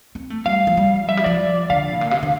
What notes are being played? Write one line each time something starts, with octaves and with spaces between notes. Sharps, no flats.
C4
A3
G3 F5
F3
G3
F3 E5
G3
F3 D5
D3 F5
A2
A#2
C3
D3